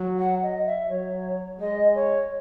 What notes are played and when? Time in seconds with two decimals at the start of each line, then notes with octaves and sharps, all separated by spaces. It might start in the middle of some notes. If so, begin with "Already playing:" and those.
Already playing: F#3
0.19 F#5
0.43 D#5
0.66 E5
0.89 F#3 C#5
1.59 G#3 D#5
1.95 C#5